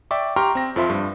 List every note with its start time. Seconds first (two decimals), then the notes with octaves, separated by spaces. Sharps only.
0.11 D5 E5 G5 C#6 D6
0.36 G4 G5 A#5 C6 C#6 F6
0.55 C4 A#6
0.76 F2 F3 E5 C6
0.90 G2